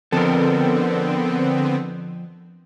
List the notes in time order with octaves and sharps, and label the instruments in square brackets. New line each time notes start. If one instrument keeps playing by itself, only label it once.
[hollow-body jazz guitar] F2 [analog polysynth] D3 B3 C4 [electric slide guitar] A4 A#4